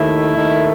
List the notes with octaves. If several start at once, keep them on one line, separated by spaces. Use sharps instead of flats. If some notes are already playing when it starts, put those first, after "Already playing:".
Already playing: D#2 D#3 A3 E4
D#2 D#3 A3